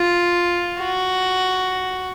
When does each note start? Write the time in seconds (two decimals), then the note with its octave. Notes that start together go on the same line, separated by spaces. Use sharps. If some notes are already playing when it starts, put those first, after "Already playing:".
Already playing: F4
0.80 F#4